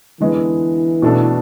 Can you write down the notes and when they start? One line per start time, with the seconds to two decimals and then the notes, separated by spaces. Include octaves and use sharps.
0.20 D3 E3 G#3 B3
1.02 B2 A3 D4 A4